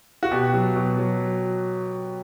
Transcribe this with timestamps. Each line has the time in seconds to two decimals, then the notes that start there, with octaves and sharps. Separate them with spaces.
0.23 F#4
0.31 B2 G4
0.54 F#3
0.76 B2
0.98 F#3